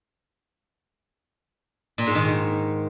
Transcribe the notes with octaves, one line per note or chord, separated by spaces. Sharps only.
A#2
G#2
D#3